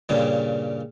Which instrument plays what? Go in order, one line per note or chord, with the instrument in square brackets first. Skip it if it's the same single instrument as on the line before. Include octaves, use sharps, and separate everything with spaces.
[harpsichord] G2 A#2 C#3 G3